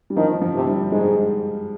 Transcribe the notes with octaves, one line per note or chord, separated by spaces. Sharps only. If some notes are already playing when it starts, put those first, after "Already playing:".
G3
D#3 F3
F3
C3
G3
G#2 G#3